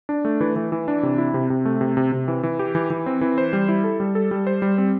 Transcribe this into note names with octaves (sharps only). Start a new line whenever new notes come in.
D4
A3
E3
E3
E3
D4
C3
E4
C3
C3
A3
C3
C3
C3
E3
E3
G4
E3
E3
C4
E3
C5
G3
E4
A4
G3
A4
G3
C5
G3
C4